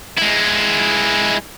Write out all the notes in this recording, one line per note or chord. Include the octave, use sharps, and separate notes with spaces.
G#3 E4